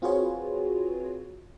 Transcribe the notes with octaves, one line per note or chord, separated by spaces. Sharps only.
C4 F4 F#4 G#4 B4 C#5